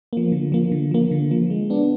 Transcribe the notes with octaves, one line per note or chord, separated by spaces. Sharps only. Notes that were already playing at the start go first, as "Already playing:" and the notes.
F3 A#3
D3
F3 A#3
D3
F3 A#3
D3
F3 A#3
G#3
B3 D4